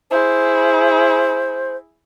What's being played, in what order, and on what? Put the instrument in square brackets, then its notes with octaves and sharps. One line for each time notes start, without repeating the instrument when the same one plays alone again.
[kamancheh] E4 G#4 [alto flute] C5